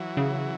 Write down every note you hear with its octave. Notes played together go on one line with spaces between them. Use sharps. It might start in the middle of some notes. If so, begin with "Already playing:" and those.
Already playing: E3 F#3
C#3